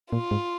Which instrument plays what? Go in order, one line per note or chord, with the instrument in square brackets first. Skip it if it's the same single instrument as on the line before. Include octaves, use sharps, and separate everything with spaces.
[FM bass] A#2 [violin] F4
[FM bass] G#2